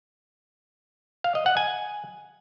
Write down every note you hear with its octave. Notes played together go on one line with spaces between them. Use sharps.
F5
D#5
F#5
G#5